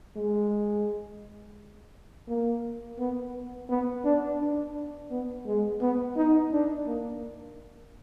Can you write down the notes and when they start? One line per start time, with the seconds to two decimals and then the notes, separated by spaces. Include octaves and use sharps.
0.16 G#3
2.28 A#3
2.99 B3
3.70 B3
4.05 D4
4.40 D4
5.11 B3
5.46 G#3
5.81 B3
6.17 D#4
6.52 D4
6.87 A#3